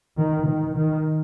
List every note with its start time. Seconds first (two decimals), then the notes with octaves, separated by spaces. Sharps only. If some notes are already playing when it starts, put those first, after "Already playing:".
0.18 D#3
0.48 D#3
0.76 D#3